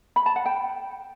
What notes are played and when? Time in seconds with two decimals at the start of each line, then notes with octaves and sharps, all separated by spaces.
0.16 B5
0.26 A5
0.36 F#5
0.46 G5